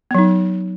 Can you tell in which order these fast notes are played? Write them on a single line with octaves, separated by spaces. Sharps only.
B3 F#3 D#4